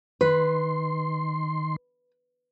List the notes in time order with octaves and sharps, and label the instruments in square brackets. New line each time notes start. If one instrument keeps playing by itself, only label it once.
[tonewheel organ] D#3 C6 [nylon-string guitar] B4